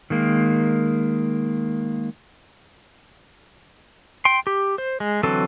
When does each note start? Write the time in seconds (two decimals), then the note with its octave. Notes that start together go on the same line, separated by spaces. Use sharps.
0.10 D#3 G#3 A#3
4.25 G5 C6
4.47 G4
4.78 C5
5.00 G#3
5.23 D3 E3 F#3 C4 A4